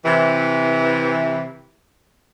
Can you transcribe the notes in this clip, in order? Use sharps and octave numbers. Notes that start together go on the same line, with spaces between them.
C3 E3